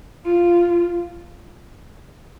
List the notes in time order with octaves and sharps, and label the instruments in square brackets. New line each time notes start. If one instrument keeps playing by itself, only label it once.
[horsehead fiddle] F4